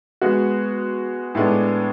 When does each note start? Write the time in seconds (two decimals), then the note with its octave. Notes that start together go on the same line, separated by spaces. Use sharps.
0.21 G#3 B3 F#4
1.35 A2 G#3 B3 D4